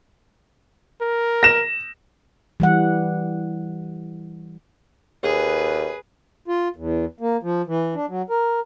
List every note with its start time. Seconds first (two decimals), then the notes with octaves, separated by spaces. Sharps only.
1.01 A#4
1.43 A#6 E7
2.60 E3 G3 F#5
5.23 D#2 G#4 B4
6.48 F4
6.76 E2
7.20 A#3
7.43 F3
7.67 E3
7.94 D4
8.09 F#3
8.30 A#4